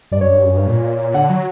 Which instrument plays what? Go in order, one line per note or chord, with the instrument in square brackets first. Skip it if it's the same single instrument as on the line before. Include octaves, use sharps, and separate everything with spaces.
[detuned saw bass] G2 [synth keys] D5
[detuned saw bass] F#2 [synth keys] C#5
[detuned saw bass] G2
F#2
G2
A#2
[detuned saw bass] D3 [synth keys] F#5
[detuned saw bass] F#3